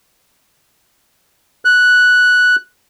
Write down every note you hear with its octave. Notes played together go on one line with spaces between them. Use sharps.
F#6